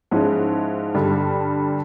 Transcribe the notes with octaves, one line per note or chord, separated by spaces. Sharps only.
G#2 F3 G#3 C#4 E4
G2 D3 G3